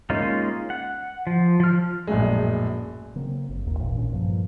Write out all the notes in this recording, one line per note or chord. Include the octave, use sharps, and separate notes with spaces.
G#3 A#3 C#4 D#4 F4
F#5
F3
F3 F6
A#1 F#2 A2 G#3
C#3 F#3 A#3 C4
G1
D#1 D#2 A#3
G#1 D#2 A#2 E3
B1 A#2 C#4 D4
G2 A#2 F3 A#3